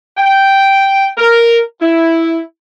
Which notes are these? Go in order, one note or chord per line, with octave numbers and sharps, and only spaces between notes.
G5
A#4
E4